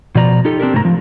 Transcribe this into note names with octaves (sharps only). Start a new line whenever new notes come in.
B2 F3 D5 A#5
D#4 F4 G4 A4
C4 D4 G4 A#4
G#2 C3 A3 G4 A#5
F3